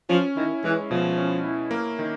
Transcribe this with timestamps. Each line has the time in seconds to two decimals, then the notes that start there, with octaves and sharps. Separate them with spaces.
0.09 F3 C#4
0.36 D#3 E4
0.64 E3 G#3
0.91 B2 F3
1.18 C#4
1.44 E4
1.71 A#3
1.99 D#3